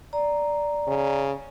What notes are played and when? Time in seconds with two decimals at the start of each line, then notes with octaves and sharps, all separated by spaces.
0.13 D5 A#5
0.87 C#3